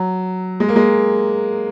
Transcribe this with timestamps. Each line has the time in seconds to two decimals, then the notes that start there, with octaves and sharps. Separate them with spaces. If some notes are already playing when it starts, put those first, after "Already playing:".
Already playing: F#3
0.60 G#3
0.69 A#3
0.76 G#3